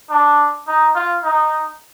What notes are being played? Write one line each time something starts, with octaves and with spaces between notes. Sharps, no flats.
D4
D#4
F4
D#4